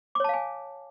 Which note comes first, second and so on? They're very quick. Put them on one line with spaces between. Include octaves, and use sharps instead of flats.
D6 C#5 A5 F5 G#5